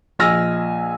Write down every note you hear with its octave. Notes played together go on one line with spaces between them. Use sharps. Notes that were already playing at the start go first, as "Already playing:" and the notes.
A#1 D#5 G#5 E6 F6 A#6